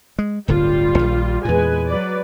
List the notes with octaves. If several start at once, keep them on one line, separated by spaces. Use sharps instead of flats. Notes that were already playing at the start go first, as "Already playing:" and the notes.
G#3
D1 G1 D3 G3 F4
A#1 D#3
E2 A#2 G#3 B4 G#5
F#3 B4 D5